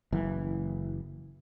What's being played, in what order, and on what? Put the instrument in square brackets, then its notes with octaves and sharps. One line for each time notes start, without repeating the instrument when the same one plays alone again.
[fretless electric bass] F#1 E3